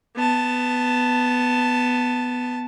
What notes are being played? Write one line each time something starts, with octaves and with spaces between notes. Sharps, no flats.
B3 A5